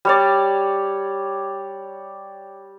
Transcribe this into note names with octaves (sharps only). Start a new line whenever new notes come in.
G3 C#5 D5